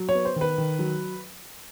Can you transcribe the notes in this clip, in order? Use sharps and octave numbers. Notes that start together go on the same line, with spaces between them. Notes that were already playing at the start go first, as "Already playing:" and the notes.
Already playing: F#3
C#5
B3
C5
D#3
B4
D#3
F#3